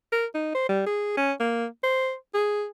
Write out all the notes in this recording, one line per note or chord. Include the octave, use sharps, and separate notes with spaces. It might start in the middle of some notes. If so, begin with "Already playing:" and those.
A#4
D#4
C5
G3
G#4
C#4
A#3
C5
G#4